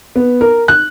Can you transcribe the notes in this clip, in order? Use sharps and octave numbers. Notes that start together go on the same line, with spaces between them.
B3
A#4
F#6